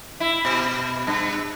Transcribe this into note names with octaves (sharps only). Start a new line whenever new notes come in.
E4
B2
G2